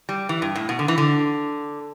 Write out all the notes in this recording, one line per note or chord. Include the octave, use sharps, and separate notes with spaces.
G3
E3
G2
A2
B2
D3
E3
D3